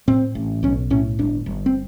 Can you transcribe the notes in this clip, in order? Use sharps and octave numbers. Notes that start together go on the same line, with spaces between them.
A2 C4
A1
B1 C#4
A2 C#4
G1 D4
G1
C4